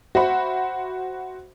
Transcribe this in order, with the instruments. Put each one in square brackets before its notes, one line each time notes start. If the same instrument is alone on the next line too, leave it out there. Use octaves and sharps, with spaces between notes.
[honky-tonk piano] F#4 C5 E5 F#5 B5